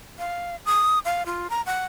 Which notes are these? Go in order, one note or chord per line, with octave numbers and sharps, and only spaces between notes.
F5
D#6
F5
F4
A#5
F#5